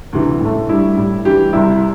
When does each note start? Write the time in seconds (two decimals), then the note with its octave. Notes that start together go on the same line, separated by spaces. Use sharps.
0.13 D2 C3 E3
0.41 A2 A3
0.69 G2 G3 E4
0.97 A2 G3
1.25 G2 E3 G3 G4
1.53 C2 C3 G3 E4